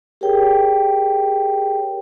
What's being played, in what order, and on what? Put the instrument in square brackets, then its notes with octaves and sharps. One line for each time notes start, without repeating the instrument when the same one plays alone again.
[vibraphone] G4 G#4 A#4 C#5 G5